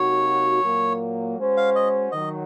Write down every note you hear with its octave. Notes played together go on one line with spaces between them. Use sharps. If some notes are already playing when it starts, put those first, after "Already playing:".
Already playing: C3 F#3 A#3 D#4 F#4 C#5
A#2 F#3 A#3
G#3 C#4 F#4 C5
F5
D#5
D#3 F#3 D#5